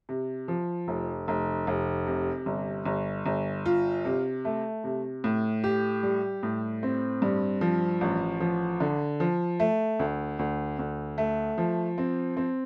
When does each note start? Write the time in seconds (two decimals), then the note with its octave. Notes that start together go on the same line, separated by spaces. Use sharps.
0.09 C3
0.48 F3
0.88 F1
1.28 F1
1.67 F1
2.07 C3
2.46 G1
2.85 G1
3.26 G1
3.66 F4
4.05 C3
4.45 A3
4.84 C3
5.24 A2
5.64 G4
6.03 G3
6.43 A2
6.83 C4
7.22 G2
7.61 F3
8.01 A1
8.40 F3
8.80 D3
9.20 F3
9.60 A3
9.99 D2
10.39 D2
10.79 D2
11.18 A3
11.58 F3
11.98 C4
12.37 C4